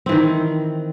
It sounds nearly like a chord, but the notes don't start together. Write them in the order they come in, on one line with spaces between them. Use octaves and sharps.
C4 E3 D#3